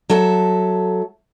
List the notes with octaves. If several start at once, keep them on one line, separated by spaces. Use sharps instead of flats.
F#3 A4 E5